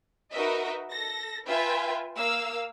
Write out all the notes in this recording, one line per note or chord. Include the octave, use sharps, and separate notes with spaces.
D#4 F#4 A#4 B4 D#5 E5
A4 A#6
F4 B4 E5 G5 G#5
A#3 F5 E6